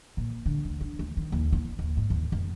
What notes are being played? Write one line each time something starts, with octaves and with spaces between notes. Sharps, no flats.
A#2
D3
D2
D3
D2
D#3
D#2
E4
D#2
G#2
D#2
F1